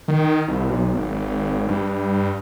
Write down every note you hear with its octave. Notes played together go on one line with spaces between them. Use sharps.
D#3
C2
B1
G#1
G2